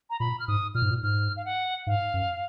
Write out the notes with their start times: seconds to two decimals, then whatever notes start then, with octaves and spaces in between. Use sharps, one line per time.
0.10 A#5
0.20 A#2 B5
0.40 F6
0.48 G#2 D#6
0.75 A#2 F6
0.82 G#2
0.90 A#2
1.03 G#2 F6
1.37 F5
1.45 F#5
1.87 G#2 F5
2.14 F#2